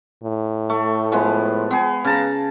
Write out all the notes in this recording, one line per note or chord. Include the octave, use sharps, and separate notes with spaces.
A2
A3
F3 G#3 B3
B3 G#4
C#3 A5 A#5